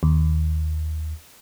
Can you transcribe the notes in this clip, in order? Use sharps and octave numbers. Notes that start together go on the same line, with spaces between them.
D#2